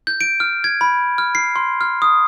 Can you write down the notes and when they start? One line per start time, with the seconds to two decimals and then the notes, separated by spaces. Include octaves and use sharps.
0.07 G6
0.21 D7
0.40 F6
0.64 G#6
0.81 B5
1.18 F6
1.35 C7
1.56 C6
1.81 F6
2.02 D#6